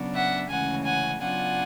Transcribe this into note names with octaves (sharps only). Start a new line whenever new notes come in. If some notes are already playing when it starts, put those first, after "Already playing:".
Already playing: C#3 F#3 B3 D4
E5 F#5
D2 C#3 E3 G#3 C#4 F#5 G#5
F#5 G#5
C#3 F#3 B3 D4 F4 F#5 G#5